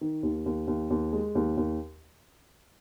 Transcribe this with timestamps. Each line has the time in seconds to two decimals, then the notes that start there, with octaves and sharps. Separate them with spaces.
0.01 D#3
0.23 D#2
0.46 D#2
0.68 D#2
0.91 D#2
1.13 G#3
1.35 D#2
1.58 D#2